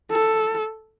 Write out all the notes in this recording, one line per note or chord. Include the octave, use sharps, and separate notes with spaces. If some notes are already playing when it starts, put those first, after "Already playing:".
A4